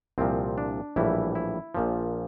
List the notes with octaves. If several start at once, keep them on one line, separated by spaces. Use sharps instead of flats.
C2 A#2 F3 C4
D4
A#1 A2 E3 G3 E4
E4
A#1 A#2 F3